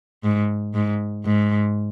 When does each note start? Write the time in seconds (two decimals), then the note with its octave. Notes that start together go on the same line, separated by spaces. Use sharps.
0.24 G#2
0.74 G#2
1.25 G#2